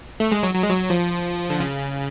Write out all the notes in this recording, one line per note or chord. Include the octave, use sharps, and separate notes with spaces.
A3
G#3
F#3
F#3
G#3
F#3
F3
D3
C#3